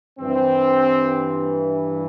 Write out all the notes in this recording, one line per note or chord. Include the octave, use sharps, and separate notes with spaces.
G2 E3 C4